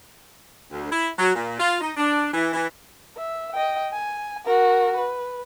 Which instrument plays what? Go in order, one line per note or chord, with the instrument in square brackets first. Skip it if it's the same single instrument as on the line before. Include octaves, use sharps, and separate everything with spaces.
[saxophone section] D2
E4
F#3
A#2
F4
D#4
D4
E3
E3
[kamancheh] E5
D#5 G5
G#5
F#4 A#4
B4